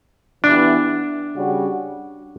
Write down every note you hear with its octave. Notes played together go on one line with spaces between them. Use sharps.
E3 B3 D4 E4 G4
C#3 G3 C#4 F#4